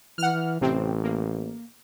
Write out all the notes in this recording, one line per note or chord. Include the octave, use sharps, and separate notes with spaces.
E3 F#5 F6
A1 C3 C4
A#3